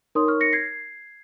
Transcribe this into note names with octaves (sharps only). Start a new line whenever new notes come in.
D#4 A#4 C#5 C6 D#6
C#6 F6
A#6 C#7
G#6 C7